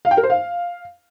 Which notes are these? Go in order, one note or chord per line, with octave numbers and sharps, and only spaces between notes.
F5
G5
A#4
C5
F5